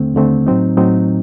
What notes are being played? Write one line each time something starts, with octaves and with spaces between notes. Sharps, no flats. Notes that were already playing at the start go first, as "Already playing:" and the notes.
Already playing: D#2 D3 A3 C4
D#2 D3 A3 C4
A2 F#3 C4 D#4
A2 F#3 C4 D#4